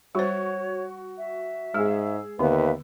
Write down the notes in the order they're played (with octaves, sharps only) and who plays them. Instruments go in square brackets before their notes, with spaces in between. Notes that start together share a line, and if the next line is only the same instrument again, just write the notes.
[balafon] G3 C5 [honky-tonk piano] F#4 C#6 [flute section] C#5
[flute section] E5
[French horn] G#2 [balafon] G#3 [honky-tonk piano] G#4 E6
[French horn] D#2 [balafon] D3 [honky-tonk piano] B3 [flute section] B4 E5 F5